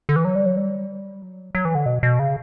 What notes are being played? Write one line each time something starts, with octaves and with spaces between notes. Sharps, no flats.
D3
E3
F#3
G3
F#3
G3
F#3
F#3
E3
D3
B2
B2
C#3